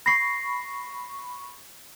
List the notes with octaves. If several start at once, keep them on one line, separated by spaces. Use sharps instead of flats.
B5 C#6 A#6 C7